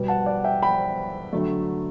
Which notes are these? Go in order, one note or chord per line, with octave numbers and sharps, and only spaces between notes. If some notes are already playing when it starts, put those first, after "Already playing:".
Already playing: B2 G3 B3
F#5 A5
D5 F#5
E5 G5
G5 B5
D3 F#3 A3